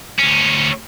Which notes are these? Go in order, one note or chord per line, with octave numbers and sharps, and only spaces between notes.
D2 C#4